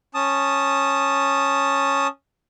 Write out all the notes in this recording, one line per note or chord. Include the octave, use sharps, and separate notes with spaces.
C#4 A5 D#6